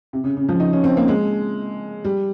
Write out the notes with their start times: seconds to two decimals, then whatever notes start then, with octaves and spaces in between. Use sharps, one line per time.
0.13 C3
0.24 C#3
0.37 C#3
0.49 F3
0.60 D#4
0.73 C#4
0.84 C4
0.97 A#3
1.08 G#3
2.05 G3